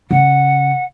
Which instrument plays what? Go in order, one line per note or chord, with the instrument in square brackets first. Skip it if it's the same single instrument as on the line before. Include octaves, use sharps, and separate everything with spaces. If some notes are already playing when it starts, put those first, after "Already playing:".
[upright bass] C#3 [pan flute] F#5